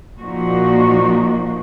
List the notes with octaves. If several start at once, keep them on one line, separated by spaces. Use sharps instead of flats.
A#2 F3 A#3 D#4 F#4